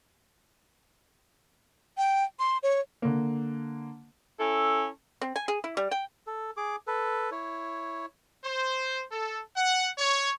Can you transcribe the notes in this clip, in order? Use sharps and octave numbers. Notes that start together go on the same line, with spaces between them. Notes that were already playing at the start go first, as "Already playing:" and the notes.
G5
C6
C#5
D3 A#3
C#4 E4 A4
C4
G#5
G#4
E4
G3
G5
A4
G#4 D6
A4 B4
E4 C#5
C5
A4
F#5
C#5